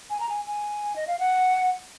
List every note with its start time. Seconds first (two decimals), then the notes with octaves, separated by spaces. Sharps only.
0.10 G#5
0.20 A#5
0.29 G#5
0.46 G#5
0.96 D#5
1.07 F5
1.19 F#5